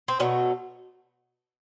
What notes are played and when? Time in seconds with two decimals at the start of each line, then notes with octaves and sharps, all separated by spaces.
0.08 C4
0.20 B2 F#3 A3 C#4